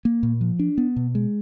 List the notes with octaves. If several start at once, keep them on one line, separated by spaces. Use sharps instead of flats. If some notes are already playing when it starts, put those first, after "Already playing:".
A#3
A#2
F3
D4
B3
B2
G#3